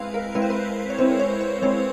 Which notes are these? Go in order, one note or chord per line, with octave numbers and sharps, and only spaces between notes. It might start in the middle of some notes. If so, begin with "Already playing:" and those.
Already playing: G#3 C4 E4 B4 F5
A#4
G#3 C4 E4 B4
C5
B4
C#5
G#3 C4 E4 C5
C#5
C5
G#3 C4 E4 C#5